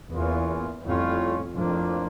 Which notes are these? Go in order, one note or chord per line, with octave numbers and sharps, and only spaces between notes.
E2 E3 A#3 C#4 F4
F2 A2 G3 C#4 F4
F2 A2 F3 A#3 D4 F4